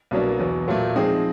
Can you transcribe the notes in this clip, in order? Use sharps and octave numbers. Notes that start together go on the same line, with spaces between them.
C2 B2 F#3 A#3 D4
E2 B2 F#3
A#2 F#3 A3
F3 G#3 C4 D#4 G#4